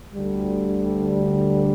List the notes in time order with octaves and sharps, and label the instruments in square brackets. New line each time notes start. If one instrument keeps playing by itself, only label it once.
[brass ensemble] D2 D3 G3